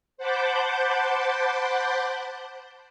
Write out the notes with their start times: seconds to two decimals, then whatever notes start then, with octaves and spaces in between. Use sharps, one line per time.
0.17 C5 F#5 A5 B5 D6 G6